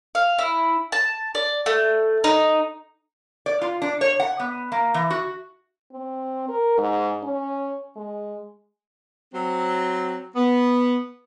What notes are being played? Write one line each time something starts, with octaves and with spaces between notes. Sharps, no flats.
F5
E4
A5
D5
A3
D#4
D5
F4
D4
C#5
F#5
B3
A#3
E3
F#4
C4
A#4
G#2
C#4
G#3
F#3 C4
B3